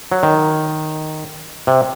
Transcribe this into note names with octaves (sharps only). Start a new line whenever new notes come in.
F#3
D#3
C3